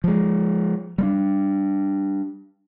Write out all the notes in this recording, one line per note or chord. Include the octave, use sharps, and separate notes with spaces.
F3 G#3
G3 G#3 D4